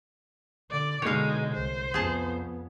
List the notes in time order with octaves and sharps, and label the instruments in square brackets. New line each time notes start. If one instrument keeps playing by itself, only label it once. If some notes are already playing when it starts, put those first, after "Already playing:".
[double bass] D3 [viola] D5
[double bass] B2 D3 [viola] G#3 D#4 [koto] C#5 F5
[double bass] C2 [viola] C5
[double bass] F2 B3 [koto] G#4 A5